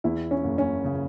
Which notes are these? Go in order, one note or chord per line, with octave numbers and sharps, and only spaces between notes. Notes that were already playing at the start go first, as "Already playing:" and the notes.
E2 E4
C#4
F#1
C#4
C#3